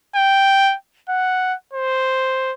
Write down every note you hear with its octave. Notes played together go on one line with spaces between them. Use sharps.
G5
F#5
C5